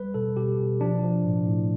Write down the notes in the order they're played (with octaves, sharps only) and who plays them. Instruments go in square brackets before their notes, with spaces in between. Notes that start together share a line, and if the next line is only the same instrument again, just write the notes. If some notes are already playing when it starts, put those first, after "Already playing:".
Already playing: [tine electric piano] G3 B4
B2 A4
B2 G4
B2
F3 D4
F3
A2
A2